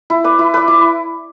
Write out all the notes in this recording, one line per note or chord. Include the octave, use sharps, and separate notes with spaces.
E4
B4 D5
E4
B4 D5
E4